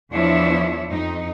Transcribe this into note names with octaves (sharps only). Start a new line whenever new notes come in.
E2 F3 D4 E4 C#5 E5
F2 D#4